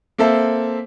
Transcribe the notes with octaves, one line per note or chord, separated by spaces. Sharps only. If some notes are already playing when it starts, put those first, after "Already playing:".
A#3 C4 A4 E5